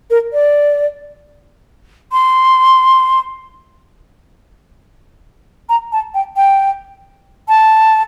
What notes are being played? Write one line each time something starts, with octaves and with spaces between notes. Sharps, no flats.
A#4
D5
C6
A#5
A5
G5
G5
A5